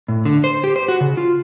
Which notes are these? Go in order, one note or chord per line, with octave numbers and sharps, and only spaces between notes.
A2
D3
C5
G4
C5
F#4
C#3
F4